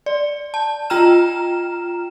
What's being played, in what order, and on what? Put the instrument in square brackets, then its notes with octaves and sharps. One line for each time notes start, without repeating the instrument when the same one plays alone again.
[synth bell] D5
A5
F4 G5 A#5 F6 E7